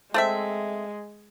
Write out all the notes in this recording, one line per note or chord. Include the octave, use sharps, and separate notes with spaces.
G#3 A3 C4 E5